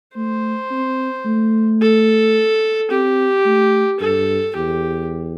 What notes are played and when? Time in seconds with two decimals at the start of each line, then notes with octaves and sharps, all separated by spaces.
0.16 A3 C5
0.71 C4
1.26 A3
1.81 A4
2.91 C4 G4
3.46 A3
4.00 G2 A4
4.55 E2 G4